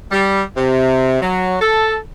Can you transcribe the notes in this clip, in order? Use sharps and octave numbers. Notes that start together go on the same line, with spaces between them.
G3
C3
F#3
A4